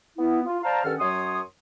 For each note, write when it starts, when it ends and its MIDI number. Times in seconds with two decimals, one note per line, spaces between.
0.18 0.41 59
0.18 0.41 64
0.47 0.59 65
0.64 0.83 72
0.64 0.83 74
0.64 0.83 77
0.64 0.83 81
0.64 0.83 82
0.84 0.94 43
0.84 0.94 51
0.84 0.94 61
0.84 0.94 69
0.84 0.94 78
0.84 0.94 89
1.00 1.40 42
1.00 1.40 54
1.00 1.40 73
1.00 1.40 84
1.00 1.40 87